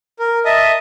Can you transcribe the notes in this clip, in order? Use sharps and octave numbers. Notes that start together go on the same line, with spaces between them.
A#4
D#5 E5 A5 D#6